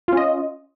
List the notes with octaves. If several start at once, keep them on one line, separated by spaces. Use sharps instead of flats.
C#4 F4 D#5